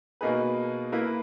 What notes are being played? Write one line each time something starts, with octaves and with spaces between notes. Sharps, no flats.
B2 A#3 D#4 G#4 B4
A#3 E4 B4